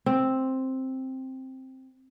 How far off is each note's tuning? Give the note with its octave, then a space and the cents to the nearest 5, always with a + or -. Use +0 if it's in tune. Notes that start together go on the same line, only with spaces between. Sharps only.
C4 +5